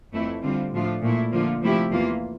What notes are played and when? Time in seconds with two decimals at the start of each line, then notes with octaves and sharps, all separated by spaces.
0.13 F2 E3 A3 C4 E4
0.43 D3 G3 C4 F4
0.73 A2 F3 A3 D4 F4
1.02 A#2 A3 E4
1.33 D3 F3 A#3 F4
1.63 C3 F3 A3 E4 G4
1.91 E2 E3 A#3 F4